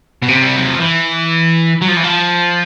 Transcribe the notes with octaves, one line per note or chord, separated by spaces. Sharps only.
B2
C3
G3
F#3
F3
E3
F#3
F3
E3
F3